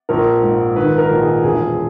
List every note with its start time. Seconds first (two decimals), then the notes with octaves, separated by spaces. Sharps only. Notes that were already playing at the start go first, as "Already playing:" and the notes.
0.09 A#1 A#4
0.42 G#2
0.76 D#3 B4
0.98 A#4
1.10 A#1
1.21 G#4
1.43 E1 G#4